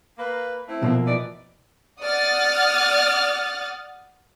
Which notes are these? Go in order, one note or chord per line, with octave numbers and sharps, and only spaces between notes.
A#3 B4
A3 C4 E4
B2 F3 A#3
E3 D#4 D5
D5 F#5 D#6 F6 F#6 A6